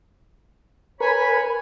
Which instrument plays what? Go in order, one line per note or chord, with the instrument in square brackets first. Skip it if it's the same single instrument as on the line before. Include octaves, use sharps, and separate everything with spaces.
[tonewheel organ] A#4 B4 [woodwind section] C#5 G#5 B5